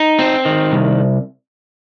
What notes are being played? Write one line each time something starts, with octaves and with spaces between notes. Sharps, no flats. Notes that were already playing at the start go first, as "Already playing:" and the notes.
Already playing: D#4
C4
D#3
C2